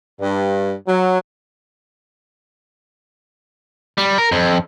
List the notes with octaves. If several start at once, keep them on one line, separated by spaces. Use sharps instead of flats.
G2
F#3
G3
A#4
F2